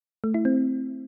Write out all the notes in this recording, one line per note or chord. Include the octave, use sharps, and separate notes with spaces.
A3
E4
C4